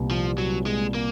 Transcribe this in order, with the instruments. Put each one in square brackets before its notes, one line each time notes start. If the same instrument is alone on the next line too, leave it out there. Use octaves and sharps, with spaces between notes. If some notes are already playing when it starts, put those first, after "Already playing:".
Already playing: [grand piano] C2 A#2 G3 B3
[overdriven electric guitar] F3
F#3
G#3
A#3